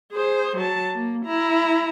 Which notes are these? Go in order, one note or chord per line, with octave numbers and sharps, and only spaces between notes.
G#4 C5
F#3 A5
A#3
E4 A#5